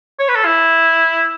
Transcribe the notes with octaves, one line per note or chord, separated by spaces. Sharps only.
C#5
B4
A4
E4